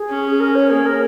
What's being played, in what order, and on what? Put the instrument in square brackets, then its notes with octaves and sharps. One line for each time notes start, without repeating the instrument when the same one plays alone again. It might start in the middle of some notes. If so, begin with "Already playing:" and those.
Already playing: [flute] G#4
[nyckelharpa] C#4
[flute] G#4
A#4
C#5
[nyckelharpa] A#3 [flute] G#4
[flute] A#4